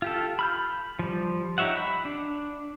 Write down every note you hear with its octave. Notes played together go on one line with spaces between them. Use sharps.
F4 G4 A4
B5 F6 G6
F3 G3
D#4 G4 C#5 E5 F#5
B5
D4